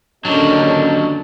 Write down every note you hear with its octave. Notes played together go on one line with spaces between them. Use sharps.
D#2 D3 F#3 C#4 D4 G4 A#4 D#5